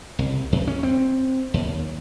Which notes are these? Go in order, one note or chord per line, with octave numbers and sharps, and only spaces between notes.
C2
E2
C#4
C4
D#2